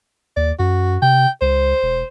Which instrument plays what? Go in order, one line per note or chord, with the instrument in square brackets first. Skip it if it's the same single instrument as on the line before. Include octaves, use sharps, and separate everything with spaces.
[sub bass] D#2 [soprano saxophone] D5
[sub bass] F#2 [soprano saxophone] F#4
[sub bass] C3 [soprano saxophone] G5
[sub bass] C#2 [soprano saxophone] C5
[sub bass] E1